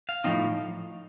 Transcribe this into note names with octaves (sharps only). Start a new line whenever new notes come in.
F5
A2 F3 C4 D#4